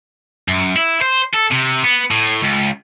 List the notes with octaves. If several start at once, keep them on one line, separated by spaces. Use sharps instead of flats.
F#2
E4
C5
A4
C3
B3
A2
C#2